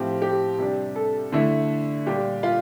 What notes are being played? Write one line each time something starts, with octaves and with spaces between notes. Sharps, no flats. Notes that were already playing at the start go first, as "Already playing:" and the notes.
Already playing: A2 F3 C4 G4
G4
C3 G3 D4
A4
D3 A3 E4
A#2 G3 D4 G4
F4